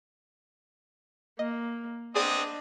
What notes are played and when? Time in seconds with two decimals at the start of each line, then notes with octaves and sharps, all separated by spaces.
1.39 A#3 D#5
2.15 B3 C4 D4 G#4 D5 D#5 D#6